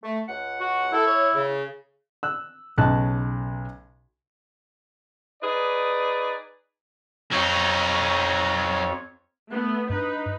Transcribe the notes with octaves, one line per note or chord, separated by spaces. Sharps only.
A3
C#2 F#5
F#4
E4 A4
C#5
C#3
E6 F#6
B1 C#3 D#4 A5 F#6
D#4 G#4 B4 D5
F2 F#3 D#4 C#5
A3 B3
G2 D#4 B4